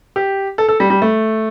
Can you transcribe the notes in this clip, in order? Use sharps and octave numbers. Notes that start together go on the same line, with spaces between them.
G4
A4
A4
G3
G3
A3